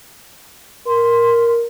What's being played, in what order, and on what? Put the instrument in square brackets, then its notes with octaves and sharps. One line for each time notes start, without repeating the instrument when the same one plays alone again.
[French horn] A#4 [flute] C6